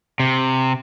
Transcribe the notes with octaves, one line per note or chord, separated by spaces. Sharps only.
C3